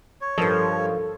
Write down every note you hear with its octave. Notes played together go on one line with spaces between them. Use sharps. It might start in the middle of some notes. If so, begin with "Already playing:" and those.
C#5
G2 F3 A4 A#4 D#5